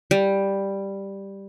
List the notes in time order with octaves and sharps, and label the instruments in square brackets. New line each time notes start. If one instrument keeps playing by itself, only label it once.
[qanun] G3